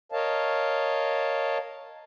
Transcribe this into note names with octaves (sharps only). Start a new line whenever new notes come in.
A#4 C#5 D#5 F5 A5